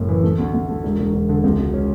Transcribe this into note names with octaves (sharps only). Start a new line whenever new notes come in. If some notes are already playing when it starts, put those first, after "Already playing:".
Already playing: F#1 A2
E3
A3
D2
D2
A3
E1
E1
E1
D3
C#2
B2
C#4